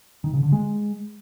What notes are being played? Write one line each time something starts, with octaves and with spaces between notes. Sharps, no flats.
D#3
C#3
D3
G#3